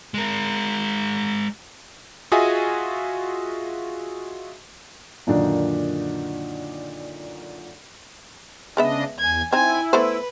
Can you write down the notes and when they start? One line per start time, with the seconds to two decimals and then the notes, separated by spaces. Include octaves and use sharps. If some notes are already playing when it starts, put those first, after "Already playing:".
0.14 G#3 A#4
2.32 F4 F#4 G#4 D#5 E5 G#5
5.27 F#2 A#2 D3 D#3 D4 D#4
8.77 C#3 G#3 B3 D4 D#5 E5
9.19 E2 G#5 G#6
9.53 C4 D#4 E4 G#5 G#6
9.93 A3 B3 B4 C5